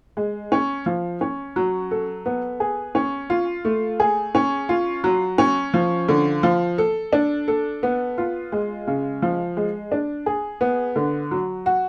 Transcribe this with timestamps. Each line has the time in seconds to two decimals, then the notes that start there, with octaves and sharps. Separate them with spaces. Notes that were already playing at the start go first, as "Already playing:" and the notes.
0.17 G#3
0.52 C#4
0.86 F3
1.21 C#4
1.56 F#3
1.91 A4
2.26 B3
2.60 G#4
2.95 C#4
3.30 F4
3.65 A3
4.00 G#4
4.35 C#4
4.69 F4
5.04 F#3
5.38 C#4
5.74 F3
6.08 D3
6.43 F3
6.78 A4
7.13 D4
7.48 A4
7.83 B3
8.18 F4
8.52 G#3
8.87 C#3
9.22 F3
9.57 G#3
9.92 D4
10.26 G#4
10.61 B3
10.96 D3
11.31 F#3
11.66 F#4